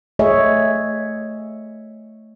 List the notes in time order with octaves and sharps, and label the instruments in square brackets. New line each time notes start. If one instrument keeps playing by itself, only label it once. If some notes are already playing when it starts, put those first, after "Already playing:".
[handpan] A3 G#4 C#5 D#5 E5